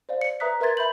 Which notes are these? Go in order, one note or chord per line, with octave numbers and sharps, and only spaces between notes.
C5 D5 F5
C#7
B4 E5 A#5 D#6 F#6 B6
A#4 B4 E5 C6 G#6 A6
E5 B5 G6 F#7